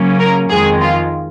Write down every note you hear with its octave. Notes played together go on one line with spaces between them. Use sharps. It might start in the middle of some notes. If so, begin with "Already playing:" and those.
Already playing: C#3 F#3 A#3 C#4
A#4
F2 D#3 G#3 G#4
F4